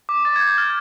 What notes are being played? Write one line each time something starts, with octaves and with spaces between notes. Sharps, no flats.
D6
D6 A6
G#6
G6
G#6
F6 A6